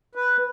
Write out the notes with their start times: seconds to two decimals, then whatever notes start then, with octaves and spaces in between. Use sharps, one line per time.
0.15 B4